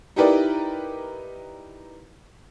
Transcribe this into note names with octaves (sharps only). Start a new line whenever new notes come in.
D#4 E4 G4 A#4 B4 D5